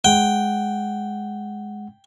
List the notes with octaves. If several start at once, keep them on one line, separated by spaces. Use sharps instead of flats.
G#3 F#5 G5